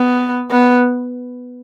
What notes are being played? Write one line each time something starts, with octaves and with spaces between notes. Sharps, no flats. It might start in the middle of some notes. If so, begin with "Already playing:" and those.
Already playing: B3
B3